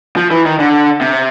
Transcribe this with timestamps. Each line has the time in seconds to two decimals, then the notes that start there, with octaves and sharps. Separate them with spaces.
0.16 F3
0.31 E3
0.45 D#3
0.59 D3
1.01 C3